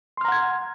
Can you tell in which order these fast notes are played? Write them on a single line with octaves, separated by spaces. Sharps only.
C6 F6 A#5 F#5 G#6